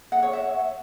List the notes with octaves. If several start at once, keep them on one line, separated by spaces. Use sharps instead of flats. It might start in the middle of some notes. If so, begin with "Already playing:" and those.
F#5
C#5
E5